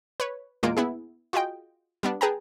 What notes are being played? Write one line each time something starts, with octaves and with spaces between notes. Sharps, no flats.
B4 C#5
E2 A#2 G#3 A#3 F4 D7
B3 E4 G#4
F4 F#4 G#4 D#5 G5
G3 B3 D4
G#4 B4 G5 A5 A#5